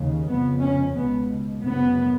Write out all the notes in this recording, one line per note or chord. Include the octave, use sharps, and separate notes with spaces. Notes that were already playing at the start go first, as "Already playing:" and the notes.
Already playing: D#2 C#3
F2 C#3 B3
C#4
C#2 B2 B3
F#2 C#3 B3